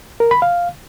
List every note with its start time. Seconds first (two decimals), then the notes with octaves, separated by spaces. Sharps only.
0.20 A#4
0.31 B5
0.42 F5